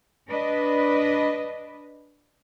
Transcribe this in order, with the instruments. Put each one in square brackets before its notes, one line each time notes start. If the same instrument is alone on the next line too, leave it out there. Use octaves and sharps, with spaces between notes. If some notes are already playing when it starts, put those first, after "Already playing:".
[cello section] D4 B4 D#5